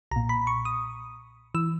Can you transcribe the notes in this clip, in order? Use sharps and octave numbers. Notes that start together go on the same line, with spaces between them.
B1 A#2 A#5
B5
C#6
D#6
E3 E6